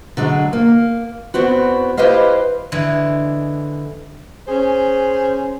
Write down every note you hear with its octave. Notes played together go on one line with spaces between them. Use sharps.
D3 F#3 G#3
A#3
E2 B3 C4 F#4
E4 G4 B4 C5 D#5 F5
D3 E3 G#3
C#4 G#4 C5